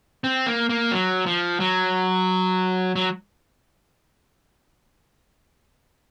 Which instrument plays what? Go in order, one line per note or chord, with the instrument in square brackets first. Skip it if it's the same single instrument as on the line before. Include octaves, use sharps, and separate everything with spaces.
[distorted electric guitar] C4
A#3
A#3
F#3
F3
F#3
F#3